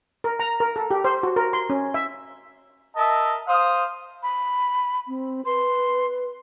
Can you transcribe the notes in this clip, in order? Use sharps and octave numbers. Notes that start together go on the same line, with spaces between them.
A#4
A#5
A#4
A4
G4
C5
F#4
A#4
C6
C#4
E5
A#4 D#5 E5 A5
C5 F5 D#6
B5
C4
B4 C6